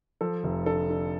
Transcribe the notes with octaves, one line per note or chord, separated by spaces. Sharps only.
F3 A4
F1
D3 A4
D3